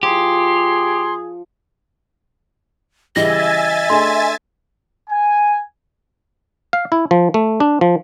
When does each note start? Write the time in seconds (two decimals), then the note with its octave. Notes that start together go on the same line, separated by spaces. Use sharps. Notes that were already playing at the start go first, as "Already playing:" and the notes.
0.03 F3 G4 G#4 C6
3.16 C#3 E3 G3 D#5 E5 G#5 A6 A#6
3.90 A3 D4 G#4 C6
5.10 G#5
6.73 F5
6.92 E4
7.11 F3
7.34 A3
7.60 D4
7.81 F3